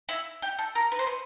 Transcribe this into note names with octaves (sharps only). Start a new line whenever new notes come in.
E4
G4
A4
A#4
B4
C5
B4